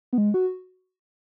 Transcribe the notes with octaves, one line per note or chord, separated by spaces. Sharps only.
B3
G#3
F#4